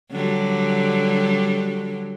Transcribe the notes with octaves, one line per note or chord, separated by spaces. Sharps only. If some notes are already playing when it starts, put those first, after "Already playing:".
D3 F#3 G3